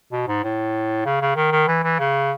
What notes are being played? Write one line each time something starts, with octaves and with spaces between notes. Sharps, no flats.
B2
G#2
A2
C#3
C#3
D#3
D#3
E3
E3
C#3